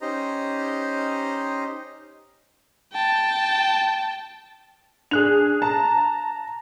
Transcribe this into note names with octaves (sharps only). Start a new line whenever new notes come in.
C#4 D#4 G4 C5 D#5 A#5
G5 A5
D4 G#4 F#6 F7
A5 A#5